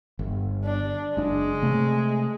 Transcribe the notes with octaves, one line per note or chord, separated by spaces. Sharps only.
G1
D4
F#1 G#3 D4
C3 A3